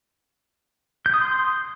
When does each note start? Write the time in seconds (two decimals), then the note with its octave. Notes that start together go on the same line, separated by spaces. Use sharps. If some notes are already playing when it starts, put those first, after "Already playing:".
1.06 G6
1.14 D#6
1.21 C6